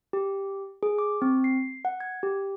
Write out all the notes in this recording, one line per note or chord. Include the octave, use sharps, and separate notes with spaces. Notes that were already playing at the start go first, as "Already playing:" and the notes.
G4
G#4
D6
C4
C7
F#5
G#6
G4